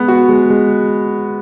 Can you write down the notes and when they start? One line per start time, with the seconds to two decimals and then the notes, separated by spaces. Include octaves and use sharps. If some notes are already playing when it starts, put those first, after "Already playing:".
Already playing: G#3 B3
0.08 F#4
0.29 G#3
0.50 G#3